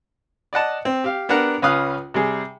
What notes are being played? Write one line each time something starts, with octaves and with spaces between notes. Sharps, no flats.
D5 D#5 F#5 A5
C4
G4 F5
B3 D4 G4 A#4 F#5 A#5
C#2 C#4 B4 F5 D#6 F#6
C3 G3 G#4